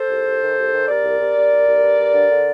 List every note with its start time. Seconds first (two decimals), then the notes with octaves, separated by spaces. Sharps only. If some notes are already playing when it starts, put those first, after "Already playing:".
Already playing: A4 C5
0.09 C2
0.25 C2
0.41 D#3
0.56 C2
0.73 D#3
0.88 C3 A#4 D5
1.04 C2
1.20 C3
1.35 C3
1.51 C2
1.67 C2
1.83 G2
1.99 G2
2.14 D3
2.30 D3